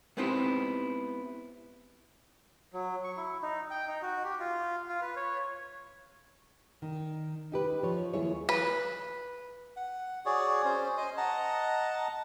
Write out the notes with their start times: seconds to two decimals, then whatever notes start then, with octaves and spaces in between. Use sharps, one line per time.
0.17 G#3 B3 C4 D#4 E4 G4
2.73 F#3
3.04 C#6
3.17 E4
3.42 D#4
3.71 G5
3.88 D#4
4.02 F#4
4.24 G4
4.40 F4
4.89 F4
5.02 B4
5.16 C#5
6.82 D#3
7.52 D#4 G4 B4
7.83 F3 C#5
8.14 D#2 E4 G#4 C#5
8.49 B4
9.76 F#5
10.26 F#4 G#4 C#5 D5
10.65 C#4 C5
10.97 C5 D#5 G#5
11.17 D#5 F#5 A5 A#5